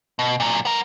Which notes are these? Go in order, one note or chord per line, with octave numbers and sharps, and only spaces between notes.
B2
A#2 F#3
B3 A#4